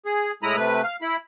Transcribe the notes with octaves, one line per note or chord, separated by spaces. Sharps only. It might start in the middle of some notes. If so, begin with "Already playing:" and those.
G#4
A2 G#3 E4 A#5 B5 D#6
C3 A3 B4
F5
E4 B5